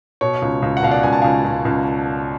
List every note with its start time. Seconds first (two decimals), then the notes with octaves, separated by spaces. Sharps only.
0.21 B2 C#5
0.42 C#2
0.62 C#2
0.77 F#5
0.83 B2 F5
0.91 D5 F#5
1.03 C#2 G#5
1.13 A5
1.22 C#2 F5 G#5
1.44 C#2
1.65 C#2